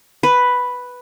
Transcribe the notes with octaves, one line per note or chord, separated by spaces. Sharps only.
B4